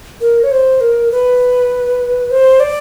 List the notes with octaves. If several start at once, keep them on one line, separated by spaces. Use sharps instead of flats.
A#4
C#5
C5
A#4
B4
C5
D5